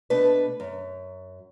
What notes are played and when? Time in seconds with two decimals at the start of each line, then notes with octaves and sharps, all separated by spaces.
0.10 B2 A3 D4 B4
0.60 F#2